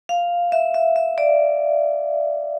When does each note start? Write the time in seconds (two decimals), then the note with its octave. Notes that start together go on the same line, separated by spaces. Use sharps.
0.09 F5
0.52 E5
0.74 E5
0.96 E5
1.18 D5